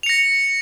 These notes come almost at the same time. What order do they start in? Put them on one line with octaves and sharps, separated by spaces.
F7 C#7 A#6